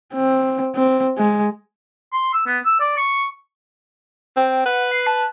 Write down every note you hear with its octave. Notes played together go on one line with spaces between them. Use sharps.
C4
C4
G#3
C6
E6
B3
E6
D5
C#6
C4 G5
B4 F#5
C7
A5